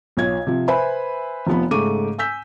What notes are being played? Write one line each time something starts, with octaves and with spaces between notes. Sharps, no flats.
B1 F4 C#5 G#6
C3 F3
B4 C5 E5 G#5 B5
F1 F3 B3 B5
G#2 C#3 A3 C#6 D6 D#7
G#5 E6 G6 B6